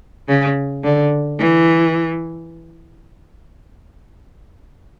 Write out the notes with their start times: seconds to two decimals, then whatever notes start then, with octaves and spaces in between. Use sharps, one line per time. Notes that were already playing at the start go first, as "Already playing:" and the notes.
0.28 C#3
0.83 D3
1.39 E3